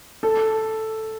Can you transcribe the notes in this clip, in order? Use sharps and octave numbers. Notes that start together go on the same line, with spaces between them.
A4